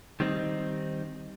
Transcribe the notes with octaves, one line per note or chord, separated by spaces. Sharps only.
D#3 G3 C4 D#4